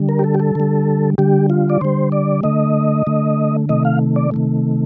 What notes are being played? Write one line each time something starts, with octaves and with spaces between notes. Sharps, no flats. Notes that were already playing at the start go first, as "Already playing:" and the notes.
Already playing: D3 G3
A#4
G4
A4
G4
A4
D3 G3
D3 G3 G4
F4
D5
D3 G3 C5
D5
D3 A3 D#5
D3 A3
C3 D#3 A3 D#5
F5
D5
C3 D#3 A3